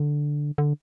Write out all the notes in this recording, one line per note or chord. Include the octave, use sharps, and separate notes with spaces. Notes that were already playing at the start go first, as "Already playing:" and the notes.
Already playing: D3
D3